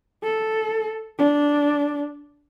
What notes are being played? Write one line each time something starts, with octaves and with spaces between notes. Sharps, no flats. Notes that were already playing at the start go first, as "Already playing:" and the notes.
A4
D4